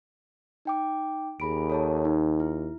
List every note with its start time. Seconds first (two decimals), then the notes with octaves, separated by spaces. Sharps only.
0.65 D#4 G5 D6
1.40 D#2 G#4 B5 D7
1.70 A4 C#5 A5
2.05 D#4
2.40 E4